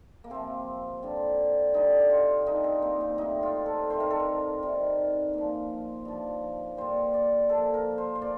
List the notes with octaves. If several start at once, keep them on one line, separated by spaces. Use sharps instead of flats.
A#3
C3 F3 C4
G2 D3 G3
G2 D3 G3 D#4
G4
F4
G2 D#3 G3 D#4
C4
A#3
C4
A2 G3 D#4
F4
A4
C3 D#3 G3 C5
A#4
A4
A#4
C3 D#3 G3
A#2 F3
G2 F3
A#2 G3 C5
D5
A#2 F3 A4
A#4
C5
C5
A#2 D5